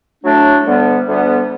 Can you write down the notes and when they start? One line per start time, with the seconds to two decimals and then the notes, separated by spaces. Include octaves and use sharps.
0.24 A2 F#3 A3 D4
0.66 D2 D3 G3 B3
1.07 D2 D3 G3 B3